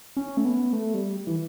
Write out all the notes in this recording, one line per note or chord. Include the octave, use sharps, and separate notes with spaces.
C#4
A3
B3
A3
G3
E3